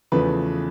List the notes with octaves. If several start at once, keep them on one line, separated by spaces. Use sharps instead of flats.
E2 C#3 F3 A3 B4